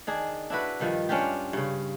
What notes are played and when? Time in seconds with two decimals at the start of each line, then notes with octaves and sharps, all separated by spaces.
0.07 D#3 D4 G#4
0.50 D4 E4 F#4 B4
0.80 G2 D#3 F3
1.09 C#4 D4 F4 G4
1.53 G2 C#3